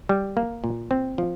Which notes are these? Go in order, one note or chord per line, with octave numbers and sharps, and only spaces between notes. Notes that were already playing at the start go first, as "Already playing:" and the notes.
G3
A#3
A#2
C4
F3